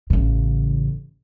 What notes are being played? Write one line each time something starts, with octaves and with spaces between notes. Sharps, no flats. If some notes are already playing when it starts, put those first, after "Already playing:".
A1 C#3